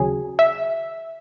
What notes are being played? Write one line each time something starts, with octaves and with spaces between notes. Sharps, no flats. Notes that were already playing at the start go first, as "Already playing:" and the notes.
Already playing: D#2 C#3 F#3 G#4
E5